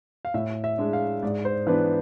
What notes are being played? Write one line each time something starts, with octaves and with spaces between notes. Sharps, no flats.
F5
A2 E5
E5
G#3 D4
F5
G#2 D5
C5
E3 B3 D4 B4